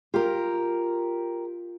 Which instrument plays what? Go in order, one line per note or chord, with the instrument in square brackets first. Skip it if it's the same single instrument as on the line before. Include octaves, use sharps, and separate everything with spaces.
[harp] F4 [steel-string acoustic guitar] G4 A#4